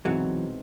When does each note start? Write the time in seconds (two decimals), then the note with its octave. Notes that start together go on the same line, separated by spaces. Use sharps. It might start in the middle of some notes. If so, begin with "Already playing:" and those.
0.05 C2 B2 E3 F#3 G#3 C4 D#4